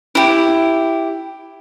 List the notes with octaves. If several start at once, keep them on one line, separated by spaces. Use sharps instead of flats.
E4 G4